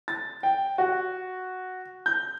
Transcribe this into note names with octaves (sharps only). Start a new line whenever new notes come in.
A6
G5
F#4
G6